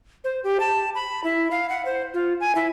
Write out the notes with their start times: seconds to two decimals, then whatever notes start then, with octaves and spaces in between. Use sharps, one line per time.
0.24 C5
0.44 G4
0.60 A5
0.95 B5
1.24 E4
1.51 F5
1.69 F#5
1.85 C5
2.14 F4
2.40 G#5
2.55 E4